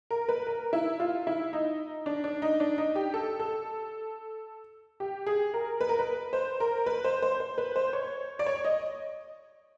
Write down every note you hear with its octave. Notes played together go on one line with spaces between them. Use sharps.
A#4
B4
A#4
E4
F4
E4
D#4
D4
D4
D#4
D4
D#4
G4
A4
A4
G4
G#4
A#4
B4
A#4
B4
C5
A#4
B4
C5
C5
C5
B4
C5
C#5
D5
C#5
D#5